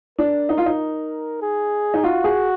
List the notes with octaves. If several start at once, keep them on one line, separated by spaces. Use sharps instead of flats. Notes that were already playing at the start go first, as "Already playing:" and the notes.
D4 A#4
D#4
F4
D#4
G#4
D#4
F4 F#4
G#4